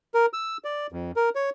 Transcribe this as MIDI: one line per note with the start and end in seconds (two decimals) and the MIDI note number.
0.14 0.26 70
0.33 0.57 88
0.64 0.87 74
0.92 1.11 41
1.16 1.29 70
1.35 1.50 73